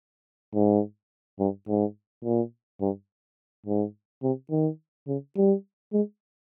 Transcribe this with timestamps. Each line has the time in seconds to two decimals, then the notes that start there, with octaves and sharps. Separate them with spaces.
0.54 G#2
1.40 G2
1.68 G#2
2.24 A#2
2.81 G2
3.66 G#2
4.23 C3
4.51 D#3
5.07 C#3
5.36 G3
5.93 G#3